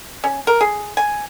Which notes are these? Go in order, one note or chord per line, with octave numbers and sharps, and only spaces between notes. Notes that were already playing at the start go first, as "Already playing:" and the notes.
C#4
A#4
G#4
G#5